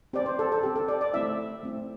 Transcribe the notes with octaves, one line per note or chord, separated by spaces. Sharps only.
C4 G4 D5
C5
A4
A4
G4
C4
A4
D5
D5
A3 C4 E4 E5
A3 C4 E4